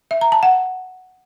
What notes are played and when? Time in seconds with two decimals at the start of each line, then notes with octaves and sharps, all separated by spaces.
0.11 E5
0.21 A#5
0.32 A5
0.43 F#5